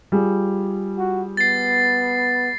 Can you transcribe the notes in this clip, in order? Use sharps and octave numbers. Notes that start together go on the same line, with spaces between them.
G3 F4 G#4
F#4
B3 A6 C7